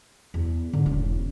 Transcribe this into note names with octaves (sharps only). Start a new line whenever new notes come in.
E2
G#2 D3
E1 C#4